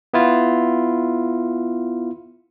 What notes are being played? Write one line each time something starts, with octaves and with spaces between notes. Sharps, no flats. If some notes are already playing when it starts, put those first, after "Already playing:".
B3 E4 F4